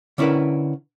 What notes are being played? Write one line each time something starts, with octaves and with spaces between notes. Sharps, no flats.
D3 C#4 E4 A#4 B4